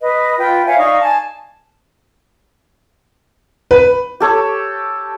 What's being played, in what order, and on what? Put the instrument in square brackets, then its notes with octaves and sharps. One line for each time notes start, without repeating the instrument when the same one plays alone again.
[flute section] B4 D#5
F4 B4 G5
C#5 E5 F5 G#5
D#4 D5 F5 C#6
G#5 A5
[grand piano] B4
[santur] G4 A4 C#5